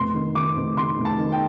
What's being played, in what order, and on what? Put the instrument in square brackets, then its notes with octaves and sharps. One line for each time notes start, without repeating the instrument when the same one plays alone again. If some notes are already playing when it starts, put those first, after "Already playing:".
Already playing: [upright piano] F1 C6
D#3
D#3 D6
F1
D#3 C6
F1
A5
D#3
G5